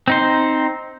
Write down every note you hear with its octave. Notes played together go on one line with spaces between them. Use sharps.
C4 D#4 C5